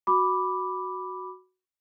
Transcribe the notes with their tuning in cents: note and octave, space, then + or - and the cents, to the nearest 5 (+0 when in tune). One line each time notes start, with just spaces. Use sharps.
F#4 +0 B5 +0 D6 +0